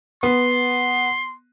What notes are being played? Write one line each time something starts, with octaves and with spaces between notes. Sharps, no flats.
B3 C6